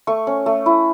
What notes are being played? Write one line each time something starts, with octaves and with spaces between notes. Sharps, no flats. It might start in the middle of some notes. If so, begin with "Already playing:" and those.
A3 C#6
C#4
A3
E4